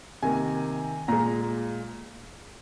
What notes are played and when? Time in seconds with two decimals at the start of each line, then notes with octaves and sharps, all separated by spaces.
0.23 C3 D#3 A#3 G#5
1.08 A#2 G#3 A#5